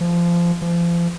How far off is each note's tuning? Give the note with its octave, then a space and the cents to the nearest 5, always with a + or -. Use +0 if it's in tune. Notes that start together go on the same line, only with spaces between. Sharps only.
F3 -20
F3 -35